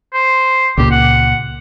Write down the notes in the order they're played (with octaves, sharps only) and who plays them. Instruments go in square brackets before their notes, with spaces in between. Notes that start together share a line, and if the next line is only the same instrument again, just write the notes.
[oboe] C5
[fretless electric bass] C#2 A#2 [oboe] G4
[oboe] F#5